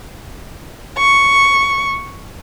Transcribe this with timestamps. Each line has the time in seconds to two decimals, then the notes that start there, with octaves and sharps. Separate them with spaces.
0.97 C#6